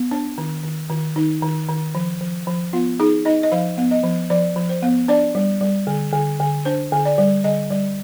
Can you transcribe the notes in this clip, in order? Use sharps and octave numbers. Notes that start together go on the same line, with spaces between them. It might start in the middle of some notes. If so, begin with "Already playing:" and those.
Already playing: B3
D4
D#3
D#3
D#3
D#3 D#4
D#3
D#3
F3
F3
F3
B3 F4
D#4 G#4
D#4 D#5
D#5
F3 F5
B3
D#5
F3
F3 D5
F3
C5
B3
D4 D5
G3
G3
D3
D3
D3
D4 C5
D3
D5
G3
D3 D#5
G3